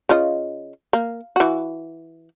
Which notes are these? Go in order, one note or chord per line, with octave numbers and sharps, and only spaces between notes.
C#3 F4 D#5
A#3
E3 F#4